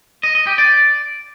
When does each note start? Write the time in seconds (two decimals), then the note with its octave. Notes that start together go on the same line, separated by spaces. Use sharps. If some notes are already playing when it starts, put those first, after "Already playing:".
0.23 D#5
0.35 D#5
0.47 G4
0.58 D5